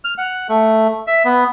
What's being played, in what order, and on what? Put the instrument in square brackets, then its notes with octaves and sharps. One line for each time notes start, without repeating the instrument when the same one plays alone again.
[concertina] F6
F#5
A3
E5
B3